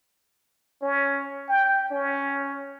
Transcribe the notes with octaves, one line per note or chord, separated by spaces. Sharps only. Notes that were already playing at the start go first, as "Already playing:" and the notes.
C#4
G5
C#4